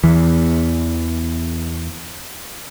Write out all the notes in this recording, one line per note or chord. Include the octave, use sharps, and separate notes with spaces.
E2 E3